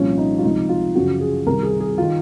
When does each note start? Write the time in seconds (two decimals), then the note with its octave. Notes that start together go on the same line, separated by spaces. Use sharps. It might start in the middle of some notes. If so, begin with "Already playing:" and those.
Already playing: C2 A#2 F3 C#4
0.18 D#4
0.38 F4
0.43 C#2 C3 F3 D#4
0.69 F4
0.95 F#2 C#3 F3 F#4
1.21 G#4
1.46 C2 C3 D#3 A#4
1.63 G#4
1.80 G#4
1.98 D#3 F4